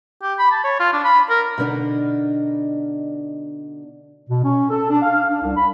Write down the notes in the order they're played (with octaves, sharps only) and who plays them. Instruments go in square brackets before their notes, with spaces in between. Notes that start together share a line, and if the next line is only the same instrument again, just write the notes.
[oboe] G4
B5
A5
C#5
F4
D4
B5
A#4
[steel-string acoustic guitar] B2 D3 C4 D4 D#4
[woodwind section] B2
C#4
A4
D4
F5
D4
C2
B5